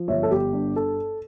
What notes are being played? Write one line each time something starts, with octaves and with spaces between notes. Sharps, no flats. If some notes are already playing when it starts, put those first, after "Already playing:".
Already playing: F3
G1 C#5 E5
A4
G1 G4
G2
A4